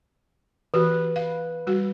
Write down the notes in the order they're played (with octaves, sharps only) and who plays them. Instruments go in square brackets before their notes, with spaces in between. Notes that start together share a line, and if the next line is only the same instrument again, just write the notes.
[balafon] E3 F#4 G4 [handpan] B4
[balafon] F5
G3 F#4